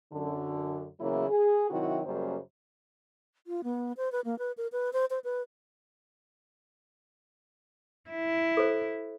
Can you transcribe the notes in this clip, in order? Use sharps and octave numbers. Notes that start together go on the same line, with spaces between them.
F#2 D3
E2 C#3 F#3 A#3 E4
G#4
C3 D#3 F#3 E4 F#4
F#2 C#3 G3 A#3 C5
F4
B3
C5
B4
A#3
B4
A#4
B4
C5
C5
B4
E4
A4 C5